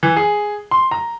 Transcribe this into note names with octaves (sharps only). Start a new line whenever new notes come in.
E3
G#4
C6
A#5